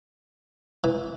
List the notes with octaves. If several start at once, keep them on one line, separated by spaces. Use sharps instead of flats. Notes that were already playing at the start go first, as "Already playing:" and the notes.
E3